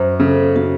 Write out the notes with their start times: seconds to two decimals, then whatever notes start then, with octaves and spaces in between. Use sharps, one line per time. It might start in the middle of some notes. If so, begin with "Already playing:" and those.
Already playing: F#2 C5
0.20 C#3 A4
0.56 C#3 F#4